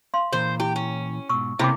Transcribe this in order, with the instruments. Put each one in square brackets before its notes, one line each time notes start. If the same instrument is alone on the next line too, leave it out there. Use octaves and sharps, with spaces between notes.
[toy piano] F5 C6
[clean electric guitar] A#2 E3 A#4 [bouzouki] C5
[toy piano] E4 [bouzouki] G4
[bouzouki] C#4
[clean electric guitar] G#2 B2 [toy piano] C#6 E6
[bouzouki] C3 [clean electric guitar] A3 A#3 C#4 [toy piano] E4 B5 D6